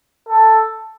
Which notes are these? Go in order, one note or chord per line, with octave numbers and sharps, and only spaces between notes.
A4